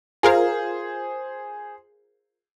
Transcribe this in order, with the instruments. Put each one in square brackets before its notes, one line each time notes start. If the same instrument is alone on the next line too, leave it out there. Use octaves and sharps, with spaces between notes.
[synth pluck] F4 A#4 F5 [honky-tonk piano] G#4 C5